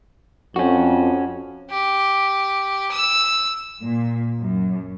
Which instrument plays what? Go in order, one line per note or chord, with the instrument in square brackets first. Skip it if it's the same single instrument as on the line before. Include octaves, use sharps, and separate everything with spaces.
[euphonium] F2 [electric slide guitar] C#4 F#4
[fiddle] G4
E6
[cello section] A#2
F#2